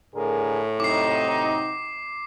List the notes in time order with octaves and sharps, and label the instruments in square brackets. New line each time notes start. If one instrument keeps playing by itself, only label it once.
[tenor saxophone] A2 [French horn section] D3 G#4 A#4
[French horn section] C3 F#3 D#4 [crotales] D6 C7